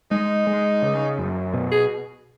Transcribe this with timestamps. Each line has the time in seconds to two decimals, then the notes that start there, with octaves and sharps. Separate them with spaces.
0.11 G#3 D#4
0.47 G#3
0.82 C#3
1.18 F#2
1.54 B2
1.71 G#4